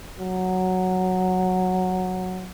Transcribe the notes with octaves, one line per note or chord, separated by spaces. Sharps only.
F#3